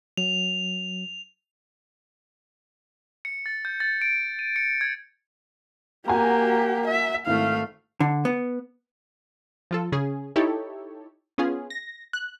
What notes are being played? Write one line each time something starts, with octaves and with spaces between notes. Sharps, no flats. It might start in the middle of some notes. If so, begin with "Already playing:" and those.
F#3 F7
C#7
A6
G6
A6
D7
D#7
C#7
G#6
A#3 F#4 G4 G#5 A#5
E5
G#1 A3 E4 F5
D3
B3
F3 F4 A4
C#3 C#4 G#4
D#4 E4 G4 A4 C#5
B3 C#4 F4 G#4
A#6
F#6